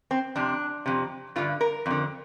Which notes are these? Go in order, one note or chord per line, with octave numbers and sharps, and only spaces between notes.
C4
F2 C3 D4
F2 C3
G2 D3 F4
A#4
F2 D3